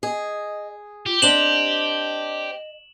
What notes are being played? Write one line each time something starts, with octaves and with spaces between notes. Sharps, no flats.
G#4 D#5
F4 G4
C4 D4 C5 D#5 E7 F#7